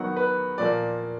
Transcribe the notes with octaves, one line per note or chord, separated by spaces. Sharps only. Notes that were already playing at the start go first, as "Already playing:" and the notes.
Already playing: D#3 F#3 B3 F#5
B4
A#2 F3 A#3 D5